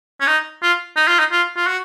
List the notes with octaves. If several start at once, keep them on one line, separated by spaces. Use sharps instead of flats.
C#4
D#4
F4
D#4
F4
D#4
F4
F4
F#4